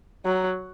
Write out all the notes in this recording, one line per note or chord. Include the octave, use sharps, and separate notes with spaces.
F#3